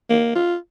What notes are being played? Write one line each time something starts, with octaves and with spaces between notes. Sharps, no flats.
A#3
F4